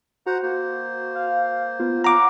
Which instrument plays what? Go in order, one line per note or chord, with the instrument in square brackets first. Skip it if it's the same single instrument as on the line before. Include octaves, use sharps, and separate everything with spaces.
[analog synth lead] F#4 [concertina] C5 F#5 A#5
[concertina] A#3 C5
[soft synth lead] F5
[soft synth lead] B3 [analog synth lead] F4
[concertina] C#5 F5 [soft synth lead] F#5 [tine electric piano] A#5 D6